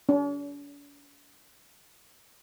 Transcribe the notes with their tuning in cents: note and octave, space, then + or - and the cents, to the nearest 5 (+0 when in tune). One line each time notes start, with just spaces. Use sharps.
D4 -45